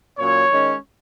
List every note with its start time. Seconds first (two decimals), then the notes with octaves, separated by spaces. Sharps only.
0.18 A#2 F#3 C#4 C#5
0.49 D#3 G#3 C#4